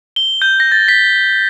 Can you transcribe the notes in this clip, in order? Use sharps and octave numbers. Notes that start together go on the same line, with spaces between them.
G7
G6
A#6
A6
B6